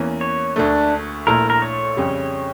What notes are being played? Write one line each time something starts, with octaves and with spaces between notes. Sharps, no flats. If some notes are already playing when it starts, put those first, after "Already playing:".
Already playing: E2 E3 A#3 C#4
C#5
D2 D3 A3 D4
A#1 A#2 A3 E4 A4 A#4
A#4
C#5
F2 C#3 G3